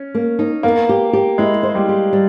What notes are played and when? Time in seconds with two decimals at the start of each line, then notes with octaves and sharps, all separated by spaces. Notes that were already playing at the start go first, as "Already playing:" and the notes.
Already playing: C#4
0.15 A#3
0.39 D#4
0.63 A#3 B3
0.89 G4
1.13 G4
1.38 G#3 E4
1.63 C5
1.75 G3
1.89 G4
2.13 G3